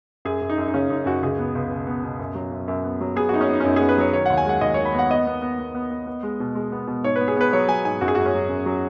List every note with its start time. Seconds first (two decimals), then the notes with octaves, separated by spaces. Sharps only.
0.25 F#2 G#4
0.41 F#2
0.49 D#4
0.58 F#2
0.68 D#4
0.74 C#3 C#4
0.90 F#2 D#4
1.06 F#2 F#4
1.22 C#2 G#4
1.39 B3
1.55 C#2
1.71 B2
1.87 B3
2.04 B2
2.19 F#2
2.35 F#3
2.52 F#2
2.68 F#2
2.84 B3
3.01 F#3
3.16 B3 G#4
3.29 F#2 D#4 F#4
3.41 C#4
3.48 B3 D#4
3.60 C#4
3.64 F#2 D#4
3.76 B3 G#4
3.89 B4
3.98 F#3 C#5
4.13 D#3 C#5
4.26 D#2 F#5
4.37 G#5
4.46 G#3 F#5
4.61 D#2 D#5
4.74 D#3 C#5
4.85 B5
4.94 B3 F#5
5.10 B3 D#5
5.27 B3
5.42 B3
5.59 B3
5.75 B3
5.91 B3
6.07 B3
6.23 G#3
6.40 B2
6.55 G#3
6.72 B3
6.87 B2
7.04 G#2 C#5
7.16 B4
7.21 B3
7.28 G#4
7.37 B3 B4
7.53 F#3 C#5
7.68 F#3 G#5
7.85 G#2 G#5
8.01 F#2 F#4
8.08 G#4
8.15 F#2 F#4
8.26 C#4
8.34 F#3
8.49 F#2
8.66 F#3